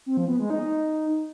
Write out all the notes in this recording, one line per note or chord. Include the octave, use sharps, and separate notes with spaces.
C4
F3
B3
G#3
D#4